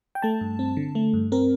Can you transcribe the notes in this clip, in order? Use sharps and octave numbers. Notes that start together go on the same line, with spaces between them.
G5
A3 A5
G2
C4
D3
A3
G2
C4 A#4